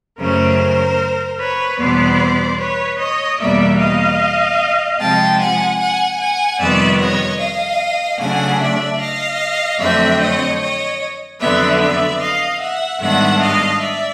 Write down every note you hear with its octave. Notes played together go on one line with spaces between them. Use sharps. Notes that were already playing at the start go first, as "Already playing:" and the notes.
F#2 C#3 F#3 A3 C#4 A#4 C5
B4 C#5
E2 B2 G3 B3 C5 D5
B4 C#5
C#5 D#5
E2 B2 G3 A#3 D5 E5
D#5 F5
C3 F3 G#3 G5 A5
F#5 G#5
F#5 G#5
F#5 G#5
F2 C3 D#3 G3 B3 D5 E5
C#5 D#5
D#5 F5
C#3 F#3 A3 D4 F#5 G#5
D5 E5
D#5 F5
F2 D3 F#3 A3 C4 D5 E5
C#5 D#5
C#5 D#5
F2 D3 F#3 B3 D5 E5
D5 E5
D#5 F5
E5 F#5
G#2 D#3 G3 B3 D4 E5 F#5
D#5 F5
D5 E5